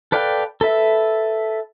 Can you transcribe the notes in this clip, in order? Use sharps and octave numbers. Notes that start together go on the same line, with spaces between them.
A4 B4 D5 F5 G5
A4 B4 E5